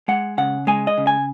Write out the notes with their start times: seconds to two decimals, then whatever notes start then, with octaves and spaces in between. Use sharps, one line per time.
0.08 G#3 F#5
0.38 C#3 F#5
0.67 G#3 G#5
0.87 D#5
0.98 C#3
1.07 G#5